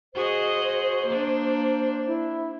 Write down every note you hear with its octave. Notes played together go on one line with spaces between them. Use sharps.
F#4 G#4 C5 D#5
A#3 D4
E4